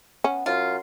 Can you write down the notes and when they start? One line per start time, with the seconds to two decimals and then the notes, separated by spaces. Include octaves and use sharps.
0.24 B3 C#4
0.46 F#2 F4